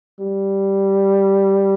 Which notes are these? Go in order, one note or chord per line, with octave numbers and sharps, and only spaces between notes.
G3